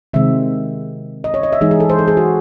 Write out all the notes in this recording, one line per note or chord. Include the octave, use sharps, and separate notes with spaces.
C3 D#3 G#3 C4 E5
D#5
C#5
D#5
E5
E3 G#3 D#4 G#4
G#4
A4
C5
A4
G#4
F#4